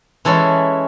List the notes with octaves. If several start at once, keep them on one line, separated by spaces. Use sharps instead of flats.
E3 G#3 C#4 E4 A4